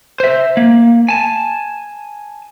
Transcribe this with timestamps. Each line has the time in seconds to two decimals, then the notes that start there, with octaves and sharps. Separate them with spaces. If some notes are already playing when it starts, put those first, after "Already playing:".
0.20 C5 E5
0.57 A#3
1.09 G#5 A5